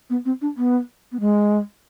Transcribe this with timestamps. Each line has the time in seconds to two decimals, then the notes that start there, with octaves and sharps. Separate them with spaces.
0.10 B3
0.25 C4
0.41 D4
0.57 B3
1.12 B3
1.20 G#3